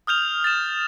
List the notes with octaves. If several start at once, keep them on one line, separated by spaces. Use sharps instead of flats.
D#6 F6 G6 F7
A6 E7